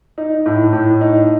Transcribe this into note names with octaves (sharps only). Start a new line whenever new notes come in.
D#4
A2
A2
D#4